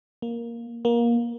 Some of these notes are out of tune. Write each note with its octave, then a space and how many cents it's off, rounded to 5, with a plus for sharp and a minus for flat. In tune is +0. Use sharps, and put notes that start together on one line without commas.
A#3 +5
A#3 +20